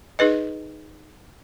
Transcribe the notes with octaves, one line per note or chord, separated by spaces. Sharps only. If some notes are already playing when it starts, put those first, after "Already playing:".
D#4 G#4 B4 D#5